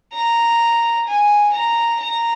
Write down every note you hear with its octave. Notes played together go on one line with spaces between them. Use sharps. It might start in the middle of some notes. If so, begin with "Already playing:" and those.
A#5
G#5
A#5
A#5